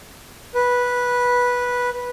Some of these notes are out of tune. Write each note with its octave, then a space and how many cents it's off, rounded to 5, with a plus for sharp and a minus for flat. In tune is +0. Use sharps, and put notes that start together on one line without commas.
B4 -10